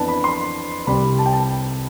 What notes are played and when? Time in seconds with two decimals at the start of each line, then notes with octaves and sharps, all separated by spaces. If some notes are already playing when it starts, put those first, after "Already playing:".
Already playing: F2 E3 B3 D4 B4 A5
0.08 B5
0.24 C6
0.87 C2 C3 G3 C4 B5
1.19 A5
1.26 G5
1.33 A5